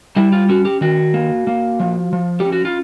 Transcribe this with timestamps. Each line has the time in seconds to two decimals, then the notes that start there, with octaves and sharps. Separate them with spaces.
0.16 G3 E4
0.32 F4
0.49 C#4 F#4
0.65 G4
0.81 D#3 F#4
1.14 A#3
1.47 A#3
1.80 F3
2.13 F3
2.40 C#4 G4
2.52 F#4
2.65 F4